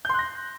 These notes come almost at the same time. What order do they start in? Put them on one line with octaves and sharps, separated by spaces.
G6 C6 F#6 A#6